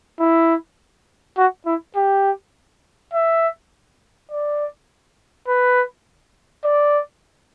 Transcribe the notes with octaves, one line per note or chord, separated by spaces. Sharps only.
E4
F#4
E4
G4
E5
D5
B4
D5